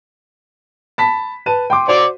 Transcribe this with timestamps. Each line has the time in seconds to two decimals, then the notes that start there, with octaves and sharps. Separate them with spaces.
0.98 A5 B5 B6
1.46 B4 A5 D#7
1.70 G5 C6 D6
1.88 F#4 C5 D5 C6 D6